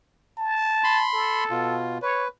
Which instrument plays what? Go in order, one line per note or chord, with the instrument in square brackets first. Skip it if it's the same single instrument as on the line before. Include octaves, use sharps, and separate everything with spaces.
[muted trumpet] A5
[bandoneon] B5 C6
[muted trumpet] A4
[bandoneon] B2 F4
[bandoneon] B4 [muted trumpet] C#5